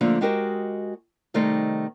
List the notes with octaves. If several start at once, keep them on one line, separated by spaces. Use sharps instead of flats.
D3 F3 A3 A#3
G#3 F#4 G4 A#4 C5 D#5
C3 D#3 G3 A3 D#4 C5